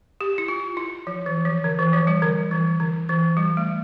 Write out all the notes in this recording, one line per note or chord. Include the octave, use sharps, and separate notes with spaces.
G4
E4
F4
E4
F3
E3
F3
D3
E3
F3
G3
D3
E3
D3
E3
G3
A3